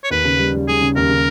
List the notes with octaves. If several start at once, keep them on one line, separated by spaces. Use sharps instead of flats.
C#5
D#2 B4
C#3
G3
G3
G3 G#4
C#3
D#2 A#4
C#3